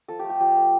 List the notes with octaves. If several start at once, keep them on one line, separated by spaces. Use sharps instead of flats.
F3 A4
A3 G4
G4
F3 G4
A3